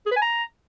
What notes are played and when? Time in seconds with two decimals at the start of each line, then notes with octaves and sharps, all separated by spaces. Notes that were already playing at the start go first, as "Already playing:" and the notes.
0.06 G#4
0.11 B4
0.16 G#5
0.21 A#5